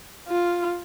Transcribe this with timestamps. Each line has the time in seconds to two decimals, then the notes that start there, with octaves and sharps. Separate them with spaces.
0.28 F4